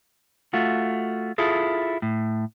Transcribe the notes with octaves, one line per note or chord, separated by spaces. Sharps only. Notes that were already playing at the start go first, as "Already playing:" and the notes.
A3 F4 F#4
E4 F4 G#4 A4
A2